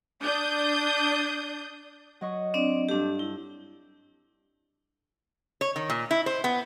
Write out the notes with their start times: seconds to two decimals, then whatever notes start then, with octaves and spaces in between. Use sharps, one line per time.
0.22 D4 D#6 G6
2.21 F#3 D#5 C#6
2.54 C4 D4 D5
2.89 G2 D4 G4 A4
3.19 E4
5.61 C#5
5.76 D#3
5.90 A#2
6.11 E4
6.26 C5
6.44 B3